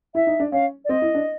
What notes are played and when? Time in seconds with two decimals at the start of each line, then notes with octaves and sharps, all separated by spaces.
0.14 E4 E5
0.27 D#4
0.40 D4
0.52 C#4 F5
0.84 D5
0.89 C4 D#5
1.02 E4
1.15 D4